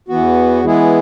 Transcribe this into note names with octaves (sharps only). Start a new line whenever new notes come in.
E2 E3 B3 F#4
E3 G#3 B3 E4 G#4